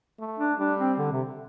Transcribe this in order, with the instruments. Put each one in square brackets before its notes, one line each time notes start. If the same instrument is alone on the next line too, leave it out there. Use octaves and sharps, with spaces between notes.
[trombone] A3
[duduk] D4
[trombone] G3 [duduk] D4
[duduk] C4
D3
C3